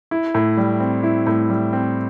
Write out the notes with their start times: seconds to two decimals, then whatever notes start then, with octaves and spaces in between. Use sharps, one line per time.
0.11 E4
0.35 A2
0.57 G3
0.80 C4
1.03 E4
1.27 A2
1.50 G3
1.73 C4